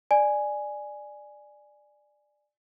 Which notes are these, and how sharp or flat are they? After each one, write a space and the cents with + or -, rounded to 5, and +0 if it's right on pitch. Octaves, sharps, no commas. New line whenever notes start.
D5 +15 G#5 +0